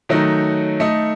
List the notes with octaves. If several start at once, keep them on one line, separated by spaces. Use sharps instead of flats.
D#3 F#3 A3 D#4
A3 D#4 A4 D#5